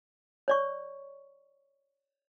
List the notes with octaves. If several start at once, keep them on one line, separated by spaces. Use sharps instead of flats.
C#5 D5 C#6